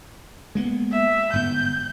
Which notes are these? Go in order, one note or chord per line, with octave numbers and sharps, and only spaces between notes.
G#3 A#3 B3
E5
G1 G#2 B3 G6